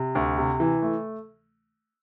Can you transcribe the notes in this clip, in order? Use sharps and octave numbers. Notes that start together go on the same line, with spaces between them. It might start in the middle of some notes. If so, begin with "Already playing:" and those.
Already playing: C3
D2
C3
E3
A3